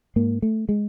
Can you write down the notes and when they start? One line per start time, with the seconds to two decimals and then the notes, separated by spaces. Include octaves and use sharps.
0.16 G#2 A#3
0.42 A3
0.69 G#3